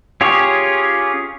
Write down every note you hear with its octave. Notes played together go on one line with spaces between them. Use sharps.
C#4 F4 G4 G#4 C#5